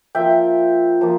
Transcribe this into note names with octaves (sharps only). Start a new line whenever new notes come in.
F3 A#3 F4 E5 G5
F3 A#3